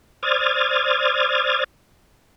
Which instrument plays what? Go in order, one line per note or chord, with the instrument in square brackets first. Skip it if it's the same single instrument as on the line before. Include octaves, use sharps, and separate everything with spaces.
[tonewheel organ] C5 D5 D#6 F6 G#6 A6